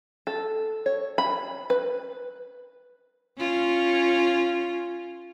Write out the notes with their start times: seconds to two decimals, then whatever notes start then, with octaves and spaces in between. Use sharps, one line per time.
0.27 A4
0.86 C#5
1.18 B5
1.70 B4
3.38 C#4 F4